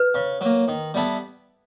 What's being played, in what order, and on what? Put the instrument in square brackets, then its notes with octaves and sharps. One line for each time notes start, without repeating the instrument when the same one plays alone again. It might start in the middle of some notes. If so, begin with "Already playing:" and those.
Already playing: [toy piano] B4
[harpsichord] C#3
F#3 A#3
D#3
G3 B3 E4 A4